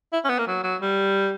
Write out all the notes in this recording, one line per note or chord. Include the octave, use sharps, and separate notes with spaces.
E4
C#4
B3
A#3
F#3
F#3
G3